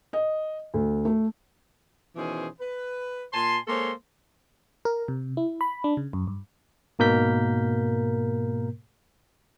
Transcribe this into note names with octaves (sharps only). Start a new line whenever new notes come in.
D#5
D2
A3
B2 D#3 E3 C#4 G#4 C5
B4
A#2 G#5 A5 C6
G#3 A#3 A4 C5 C#5 C6
A#4
C3
E4
B5
D4
C#3
F#2
G2
G#2 B2 A#3 A#4 G6 B6